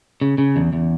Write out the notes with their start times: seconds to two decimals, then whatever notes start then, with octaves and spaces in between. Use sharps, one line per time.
0.21 C#3
0.38 C#3
0.56 E2
0.73 E2